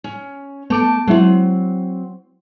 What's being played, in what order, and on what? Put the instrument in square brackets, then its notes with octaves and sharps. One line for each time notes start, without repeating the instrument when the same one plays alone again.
[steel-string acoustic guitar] C#4
[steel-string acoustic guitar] A3 A5 [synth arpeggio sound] B3 D6 D7
[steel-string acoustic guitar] F#3 C4 [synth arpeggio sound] G#3 E4